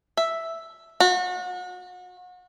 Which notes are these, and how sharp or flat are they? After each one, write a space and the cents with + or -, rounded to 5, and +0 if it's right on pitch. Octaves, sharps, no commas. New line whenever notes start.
E5 +0
F#4 -35